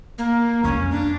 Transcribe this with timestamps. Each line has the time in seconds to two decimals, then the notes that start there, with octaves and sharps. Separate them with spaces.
0.18 A#3
0.64 F2 C#4
0.91 D4